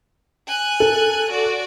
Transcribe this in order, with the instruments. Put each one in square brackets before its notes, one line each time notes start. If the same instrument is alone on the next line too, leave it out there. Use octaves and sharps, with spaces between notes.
[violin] G#5 F#6
[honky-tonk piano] A4
[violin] F#4 D5